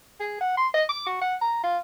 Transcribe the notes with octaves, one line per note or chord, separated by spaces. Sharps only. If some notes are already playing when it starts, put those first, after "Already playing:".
G#4
F#5
C6
D#5
D6
F#4
F#5
A#5
F4